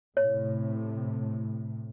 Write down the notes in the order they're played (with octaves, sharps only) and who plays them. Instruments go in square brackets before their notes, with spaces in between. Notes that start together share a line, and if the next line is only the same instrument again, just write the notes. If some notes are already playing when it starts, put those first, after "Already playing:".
[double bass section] A2 C3 [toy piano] C#5